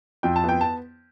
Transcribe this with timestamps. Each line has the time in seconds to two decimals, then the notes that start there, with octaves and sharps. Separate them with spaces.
0.23 F2 G5
0.36 A5
0.44 B3 G5
0.61 A5